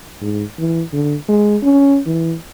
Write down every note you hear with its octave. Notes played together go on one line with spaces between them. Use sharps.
G#2
E3
D3
G#3
C#4
E3